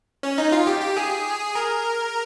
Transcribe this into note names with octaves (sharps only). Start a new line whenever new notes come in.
C#4
D#4
F4
G4
G4
G#4
A#4